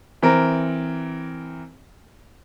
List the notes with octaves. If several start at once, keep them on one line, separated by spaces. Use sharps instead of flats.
E3 C4 A#4